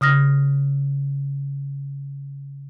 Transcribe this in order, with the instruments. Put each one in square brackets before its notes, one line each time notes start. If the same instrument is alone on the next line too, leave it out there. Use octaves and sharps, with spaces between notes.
[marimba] C#3 D#6 F6 A#6